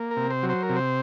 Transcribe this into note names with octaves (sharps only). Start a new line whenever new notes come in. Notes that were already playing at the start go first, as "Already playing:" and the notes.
Already playing: A#3
A#4
C3
C5
F#3
C5
A#4
C3
C5